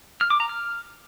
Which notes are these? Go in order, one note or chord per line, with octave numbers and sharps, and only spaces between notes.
F6
D6
A#5
F6